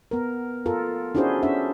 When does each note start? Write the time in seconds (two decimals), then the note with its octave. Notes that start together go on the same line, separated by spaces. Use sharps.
0.11 B3 A#4
0.66 F4 A4 A#4
1.15 C#4 D4 E4 F#4 G#4 C5
1.43 C#4 D4 E5